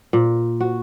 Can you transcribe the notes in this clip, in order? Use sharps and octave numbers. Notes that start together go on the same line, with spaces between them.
A#2
F#4